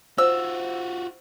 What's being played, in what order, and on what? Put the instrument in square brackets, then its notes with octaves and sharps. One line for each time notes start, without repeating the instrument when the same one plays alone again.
[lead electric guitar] F4 F#4 [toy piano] C5 [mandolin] E6